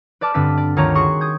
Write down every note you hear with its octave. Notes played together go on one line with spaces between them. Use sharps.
B4 D5 A5 D6 F6
G2 D3 C4 B4 F6 B6
D5
D2 D#3 F4 C#5 A#5 C#6
F#4 G#4 C6 C#6
D#6 G6 G#6